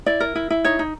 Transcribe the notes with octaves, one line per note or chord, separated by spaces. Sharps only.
E4 D5
A#4
E4
E4
D#4 C#5
D#4